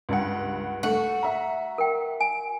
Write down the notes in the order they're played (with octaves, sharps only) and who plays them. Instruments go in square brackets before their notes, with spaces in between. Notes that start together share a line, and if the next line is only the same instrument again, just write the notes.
[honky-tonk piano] C#2 G2 F#5
[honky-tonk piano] A3 C#6 [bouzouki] F#4
[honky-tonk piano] E5 A#5
[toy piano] A#4 G5
G#5